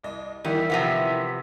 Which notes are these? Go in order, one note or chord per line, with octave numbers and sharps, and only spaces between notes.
C2 D#5
E2 D#3 E3 G3 E5
C3 F3 B3